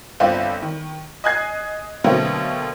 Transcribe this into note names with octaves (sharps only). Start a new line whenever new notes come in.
G1 C4 F4 D5
D#3
D#5 G#5 F#6 G#6 C7
B2 D3 F#3 A3 A#3 C4